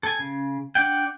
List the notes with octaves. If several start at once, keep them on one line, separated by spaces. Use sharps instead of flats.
A4 G#5
C#3
D4 F#5 G5